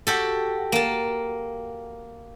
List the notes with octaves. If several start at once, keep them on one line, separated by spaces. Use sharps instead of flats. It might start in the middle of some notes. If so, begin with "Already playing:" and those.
F#4 G4 A4
A#3 A5